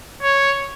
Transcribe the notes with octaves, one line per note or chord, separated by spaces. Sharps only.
C#5